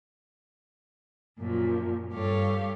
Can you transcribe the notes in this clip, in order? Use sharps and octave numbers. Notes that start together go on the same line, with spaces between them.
F#2 A#2 F3
G2 G3 G4 A4 C#5 F5